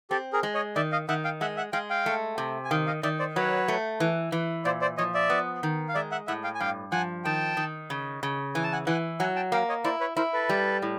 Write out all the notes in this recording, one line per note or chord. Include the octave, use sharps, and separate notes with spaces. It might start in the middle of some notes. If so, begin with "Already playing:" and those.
C4 G4 A4
G#4 A#4
G#3
C#5 D#5
D#3 D5 E5
D#5 F5
D#3 E5 F#5
F5 G5
G#3 E5 F#5
E5 F#5
G#3 F5 G5
F5 G5
A3
C3
G#5
D#3 F5 G5
D#5 F5
D#3 D5 E5
C5 D5
F#3 B4 C#5
A3
E3
E3
A#2 C5 D5
C5 D5
F3 C#5 D#5
D5 E5
B3
D#3
F5
G#3 D5 E5
E5 F#5
A2 E5 F#5
F5 G5
G#5
G2 F5 G5
F3 F#5 G#5
D#3 G5 A5
D#3
C#3
C#3
E3 G#5
A5
F#5 G#5
E3 F#5 G#5
F#3 F#5 G#5
G5 A5
A#3 F5 G5
C#5 D#5
E4 C5 D5
B4 C#5
E4 A#4 C5
A4 B4
G3
A2